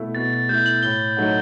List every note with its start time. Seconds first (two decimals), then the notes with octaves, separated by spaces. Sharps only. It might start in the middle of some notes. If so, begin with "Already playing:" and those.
Already playing: B2 A3 E4
0.15 B2 A6
0.33 A6
0.49 A3 E4 G6
0.66 F#7
0.83 A2 G7
1.17 F#3 A3 D#4 F#4